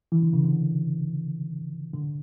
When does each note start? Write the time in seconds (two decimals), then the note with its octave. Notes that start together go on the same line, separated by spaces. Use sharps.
0.12 E3
0.23 D3
0.33 C#3
0.44 D3
1.93 D3